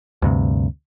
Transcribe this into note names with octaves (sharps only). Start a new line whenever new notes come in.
D2 G2 C3